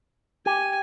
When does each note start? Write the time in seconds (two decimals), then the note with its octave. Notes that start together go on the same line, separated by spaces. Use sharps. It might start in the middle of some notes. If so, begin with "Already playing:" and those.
0.46 G4 G#5